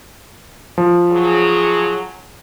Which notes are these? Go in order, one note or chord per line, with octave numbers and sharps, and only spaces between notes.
F3
F#3 G#4